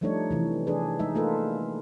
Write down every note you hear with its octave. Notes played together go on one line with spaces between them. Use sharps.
F3 G3 A3 D4 D#4 C#5
C3 E3
D4 G#4 B4
G#3 D#4 E5
A3 A#3 F4 A4 B4